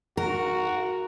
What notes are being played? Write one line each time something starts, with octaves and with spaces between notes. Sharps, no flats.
F#4 A#4